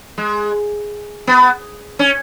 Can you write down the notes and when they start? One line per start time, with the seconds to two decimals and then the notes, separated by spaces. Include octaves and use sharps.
0.18 G#3
1.27 B3
1.99 C#4